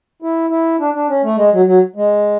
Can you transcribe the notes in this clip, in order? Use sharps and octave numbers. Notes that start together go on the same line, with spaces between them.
E4
E4
D4
D4
C#4
A3
G#3
F#3
F#3
G#3